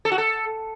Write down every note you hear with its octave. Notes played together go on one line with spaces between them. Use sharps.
A4
F#4
A4